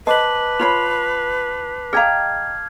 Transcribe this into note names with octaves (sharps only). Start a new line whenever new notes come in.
B4 C5 D#5 A5 D6 F#7
F4 C#5 B5 C7 F7
G#4 D#5 F5 G5 A#5 F6 G#6